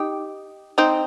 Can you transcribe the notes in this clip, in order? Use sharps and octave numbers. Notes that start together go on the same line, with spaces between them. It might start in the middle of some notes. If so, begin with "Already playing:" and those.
Already playing: D#4 G4
C4 D#4